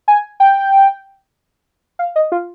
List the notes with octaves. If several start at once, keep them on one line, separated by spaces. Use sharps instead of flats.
G#5
G5
F5
D#5
F4